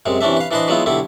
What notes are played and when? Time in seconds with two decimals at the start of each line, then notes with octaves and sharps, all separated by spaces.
0.06 F#2 C3 G#3
0.21 C3 E3 C#4 D4 E5
0.37 B4 F5
0.51 E3 D4 B4 C5 D#5 C6
0.68 F#3 G#3 B3 E4 F4
0.86 B1 D3 E4 G4